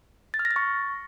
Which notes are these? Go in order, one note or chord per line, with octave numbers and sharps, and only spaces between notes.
A6
F6
A#6
A6
C#6